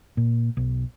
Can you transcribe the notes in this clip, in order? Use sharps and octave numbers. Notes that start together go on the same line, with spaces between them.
A#2
B1